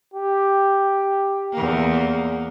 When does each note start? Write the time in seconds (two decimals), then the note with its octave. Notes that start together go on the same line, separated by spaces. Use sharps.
0.14 G4
1.52 E2 A#3